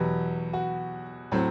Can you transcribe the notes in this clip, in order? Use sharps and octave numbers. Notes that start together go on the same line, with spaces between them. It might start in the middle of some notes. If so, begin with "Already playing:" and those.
Already playing: E2 B2 F#3 B3 G4
F#4
A2 F#3 C4